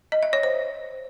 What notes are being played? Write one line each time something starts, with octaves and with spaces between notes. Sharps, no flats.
D#5
E5
C#5
C5